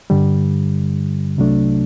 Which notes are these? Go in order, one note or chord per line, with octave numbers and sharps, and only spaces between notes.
G2 D3 G3
C2 C3 F#3 A3 D4